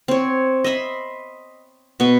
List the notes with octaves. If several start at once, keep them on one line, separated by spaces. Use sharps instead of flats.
C4 C#5
D#5 E5 B5 C6
B2 B3 C#6